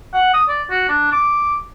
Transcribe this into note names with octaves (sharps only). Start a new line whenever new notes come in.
F#5
D#6
D5
F#4
D4
D6